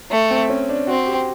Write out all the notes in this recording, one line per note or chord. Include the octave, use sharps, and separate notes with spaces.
A3
C4
C#4
D4
C4 F#4
G4